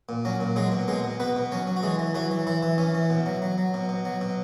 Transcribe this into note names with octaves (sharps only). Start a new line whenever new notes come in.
A#2
F#3 C#4
A#2
F#3 G#3 G#4
B2
B2 G#3 G#4
B2
B2 B3 B4
B2
F#3 C#4 C#5
F#3
F#4
E3 G#3 G#4
E3
E3 F#3 F#4
E3
E3 E4
E3
E3 C#4
E3
B2
F#3
F#3
F#3
B2
B2
F#3
B2